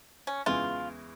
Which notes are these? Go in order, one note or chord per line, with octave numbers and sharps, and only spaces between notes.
C#4
E2 C#3 E3 G#3 E4 F4